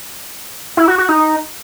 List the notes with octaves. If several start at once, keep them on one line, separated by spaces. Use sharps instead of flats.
E4
F#4
F#4
D#4